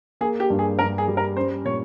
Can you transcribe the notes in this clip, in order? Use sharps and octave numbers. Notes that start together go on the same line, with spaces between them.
A#3 G#4
G4
G2
G#4
G2 A#4
G#4
G3
A#4
C#4 C5
A#2 C#5